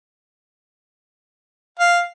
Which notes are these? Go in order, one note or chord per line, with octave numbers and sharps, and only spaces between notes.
F5